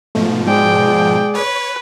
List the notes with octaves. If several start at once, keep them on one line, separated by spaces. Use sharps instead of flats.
G#2 B2 F3 A3
G#3 G#4 D5 G5
B4 C#5